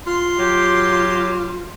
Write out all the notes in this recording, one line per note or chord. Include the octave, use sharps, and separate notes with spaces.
F4 C6
F#3 G4